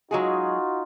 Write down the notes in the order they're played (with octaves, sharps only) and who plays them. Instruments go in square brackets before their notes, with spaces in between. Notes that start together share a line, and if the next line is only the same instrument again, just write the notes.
[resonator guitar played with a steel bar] F#3 G#3 G#4 [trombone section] D#4 F4 F#4